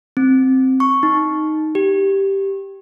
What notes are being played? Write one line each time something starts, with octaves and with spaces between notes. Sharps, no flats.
C4
C#6
D#4
G4